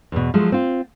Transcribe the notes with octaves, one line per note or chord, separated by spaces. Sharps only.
E2 B2
F3 F#3 G#3 A3
C4 F4